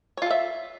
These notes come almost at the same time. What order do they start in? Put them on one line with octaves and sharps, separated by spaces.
C#5 F4 A4 E5